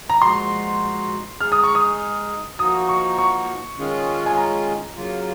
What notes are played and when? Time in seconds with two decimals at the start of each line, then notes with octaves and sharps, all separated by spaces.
0.10 A#5
0.21 A#2 F3 G#3 D#4 F#4 C6
1.40 G#3 D#4 G#4 F6
1.52 D#6
1.63 C#6
1.75 D#6
2.59 F3 A#3 D#4 F#4 D#6
2.89 C#6
3.18 C#6
3.78 D#3 G#3 C#4 F4 G#4
4.26 G#5
4.37 A#5
4.96 C#3 F#3 A#3 F4